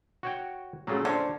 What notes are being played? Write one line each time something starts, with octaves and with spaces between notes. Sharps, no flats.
F#4 C#5 G5
A#2 C#3 F#3 A3
D3 C5 C#5